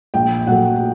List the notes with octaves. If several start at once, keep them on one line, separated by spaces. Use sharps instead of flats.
A#1 G5
A#2 F#3 A3 F#5